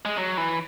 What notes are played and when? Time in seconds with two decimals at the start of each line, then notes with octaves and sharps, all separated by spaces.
0.05 G#3
0.17 F#3
0.37 E3